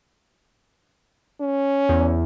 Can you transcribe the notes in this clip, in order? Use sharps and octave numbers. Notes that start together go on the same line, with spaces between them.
C#4
E2